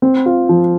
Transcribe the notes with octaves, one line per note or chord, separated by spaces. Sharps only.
C4
F4
F3